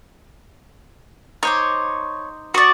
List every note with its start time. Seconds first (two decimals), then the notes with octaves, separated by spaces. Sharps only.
1.43 D#4 C5 C#5 D6
2.54 F#4 D5 C#6 D#6